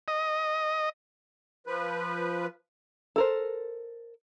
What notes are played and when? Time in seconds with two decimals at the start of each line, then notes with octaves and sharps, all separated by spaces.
0.08 D#5
1.67 F3 B4
3.16 A4 A#4 C5